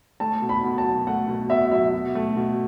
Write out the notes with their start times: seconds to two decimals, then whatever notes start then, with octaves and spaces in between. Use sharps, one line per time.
0.20 A3 A5
0.42 B2
0.49 B5
0.64 B2
0.78 A5
0.84 F#3
1.07 A3 F#5
1.28 B2
1.50 B2 E5
1.71 F#3 E5
1.93 B2
2.15 A3
2.36 B2